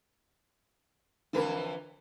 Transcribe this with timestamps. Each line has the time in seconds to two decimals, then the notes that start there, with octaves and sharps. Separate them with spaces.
1.33 F2 D3 E3 A#4 B4